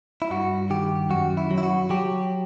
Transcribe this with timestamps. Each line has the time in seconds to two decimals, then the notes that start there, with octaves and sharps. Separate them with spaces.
0.22 E4
0.30 G2 F#4
0.70 D#3 G4
1.10 F#2 F#4
1.37 E4
1.51 F#3
1.58 E4
1.63 F#4
1.90 F#3 G4